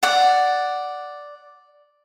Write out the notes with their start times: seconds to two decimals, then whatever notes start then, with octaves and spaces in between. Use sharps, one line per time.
0.03 D5 F#5